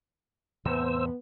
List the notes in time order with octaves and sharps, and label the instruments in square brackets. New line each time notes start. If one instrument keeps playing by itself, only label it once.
[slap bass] E2 A2 C3 [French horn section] B3 [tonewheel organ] C5 E6